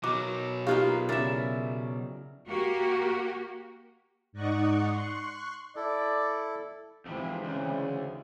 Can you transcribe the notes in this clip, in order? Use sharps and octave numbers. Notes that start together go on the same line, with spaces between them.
B2 F#3 D#4 F#4 A#4 D6
D#4 F4 G4 G#4 A#4 B4 F5
C#3 E4 A#4 D5 E5
A#3 F#4 G4
G#2 D#4 D5 D#5 F#5 C#6
C6 C#6 F#6
E4 A4 D5
F2 C3 E3 G#3 C4
D2 C#3